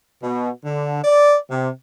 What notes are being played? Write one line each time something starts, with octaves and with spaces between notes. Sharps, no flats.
B2
D3
D5
C3